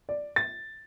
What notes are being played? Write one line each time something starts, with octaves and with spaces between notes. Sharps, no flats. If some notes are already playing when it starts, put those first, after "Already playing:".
D5
A6